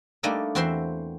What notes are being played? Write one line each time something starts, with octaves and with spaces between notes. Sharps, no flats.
G3 A3 A#3 D4 D#4 A4
E2 C4 F#4 C5 E5 C6